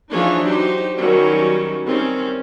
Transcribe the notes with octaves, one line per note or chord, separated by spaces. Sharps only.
E3 F3 D4 D#4 G#4 C#5
F#3 D#4 G4 C5
D#3 F#3 G3 C#4
D#3 G3 C4 C#4